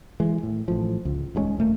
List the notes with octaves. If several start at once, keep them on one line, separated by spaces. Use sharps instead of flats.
E3 G#3
A2
A1 A2 F3
C#2
D#1 G2 G#3 C#4
D#1 A#2 A3 A#3